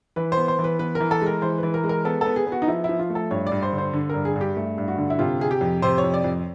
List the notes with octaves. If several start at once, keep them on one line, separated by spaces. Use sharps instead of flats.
E3 B4
C5
B3
C5
E3
B4
B3 B4
A#4
E3
A4
G#3 A#4
E3 C5
E3 B4
A#4
G#3
A#4
B3 A4
A4
B3
G#4
B3
F#4
D#4
F3 E4
F3 E4
F4
A3
A4
G2 C#5
D5
G2
C5
D3
C5
D3
G2 A#4
G#4
G2
G4
A3
G2
F#4
D3
E4
C3 F4
C3 G#4
G4
F2
C3 C5
C#5
F2
D5
F2